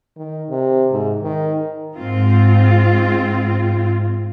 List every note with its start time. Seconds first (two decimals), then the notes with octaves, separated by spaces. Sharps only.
0.17 D#3
0.49 C3
0.92 G#2
1.23 D#3
1.96 G#2 C4 F4